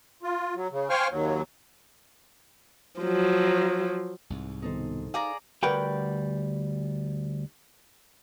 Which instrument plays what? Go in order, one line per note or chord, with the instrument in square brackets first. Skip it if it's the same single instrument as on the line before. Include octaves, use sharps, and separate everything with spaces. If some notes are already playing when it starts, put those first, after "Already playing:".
[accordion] F4
F#3
C#3
C5 F5 G5 G#5 C#6 F6
D#2 F#3
[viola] F3 F#3
[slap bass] C2 G#2
[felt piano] B2 D#3 [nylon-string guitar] D#4 A4 C5
[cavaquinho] G#4 D5 A#5 [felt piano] F5
[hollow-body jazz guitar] D2 G3 A#4 B4 F#5 G5